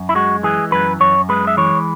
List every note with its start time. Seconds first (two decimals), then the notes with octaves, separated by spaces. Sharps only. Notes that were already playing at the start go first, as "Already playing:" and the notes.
Already playing: F#2
0.09 E4
0.15 G#3 F#4
0.43 E3 G#4
0.72 F#2 B4
1.00 F#2 C#5
1.29 G#3 B4
1.47 E5
1.57 E3 C#5